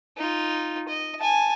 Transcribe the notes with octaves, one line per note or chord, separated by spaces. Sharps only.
D#4 F4
D#5
G#5 A5